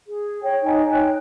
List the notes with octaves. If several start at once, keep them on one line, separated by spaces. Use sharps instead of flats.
G#4
C#5 G5
D#4 C#5 G5 G#5
G5 F#6